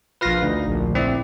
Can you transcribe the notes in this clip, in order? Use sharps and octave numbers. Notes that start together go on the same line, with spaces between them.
A#1 F4 B4 F5 A#6
D2 D#4
A#1
C4 E4 D5